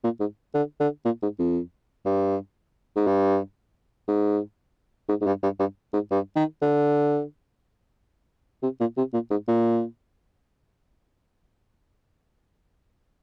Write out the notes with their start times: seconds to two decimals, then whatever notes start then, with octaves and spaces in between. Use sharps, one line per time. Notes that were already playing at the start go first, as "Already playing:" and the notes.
0.04 A#2
0.20 G#2
0.54 D3
0.80 D3
1.05 A#2
1.22 G#2
1.39 F2
2.06 G2
2.96 G#2
3.07 G2
4.08 G#2
5.09 G#2
5.21 G#2
5.27 G2
5.43 G2
5.59 G2
5.93 G#2
6.11 G2
6.36 D#3
6.62 D3
8.63 C3
8.80 A#2
8.97 C3
9.13 A#2
9.31 G#2
9.48 A#2